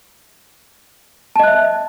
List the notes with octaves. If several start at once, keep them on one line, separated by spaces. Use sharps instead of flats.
D#5 E5 A5 F#6